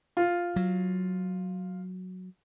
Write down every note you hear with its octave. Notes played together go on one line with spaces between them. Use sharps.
F4
F#3